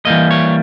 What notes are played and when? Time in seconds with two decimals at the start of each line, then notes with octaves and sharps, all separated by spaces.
0.05 E3 G3 A#3 D#5
0.31 C#5